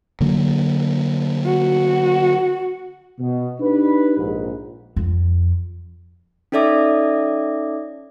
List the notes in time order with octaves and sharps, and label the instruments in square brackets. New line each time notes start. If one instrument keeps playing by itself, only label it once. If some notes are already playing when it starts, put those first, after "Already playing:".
[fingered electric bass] D3 F#3 A#3
[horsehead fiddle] F#4
[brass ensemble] B2
D4 D#4 G4 B4
A#1 G#2
[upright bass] F2
[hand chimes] C#4 D#4 A4 D5 E5 D6